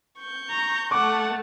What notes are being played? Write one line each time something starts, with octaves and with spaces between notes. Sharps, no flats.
C#6 G6
A#5
A3 F#5 A5 C#6 D6